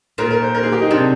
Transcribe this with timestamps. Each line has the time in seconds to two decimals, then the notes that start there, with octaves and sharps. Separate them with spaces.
0.18 A#2 A#4
0.30 A#4
0.42 C5
0.55 A#4
0.63 G#4
0.72 G4
0.82 D#4
0.90 C3 D4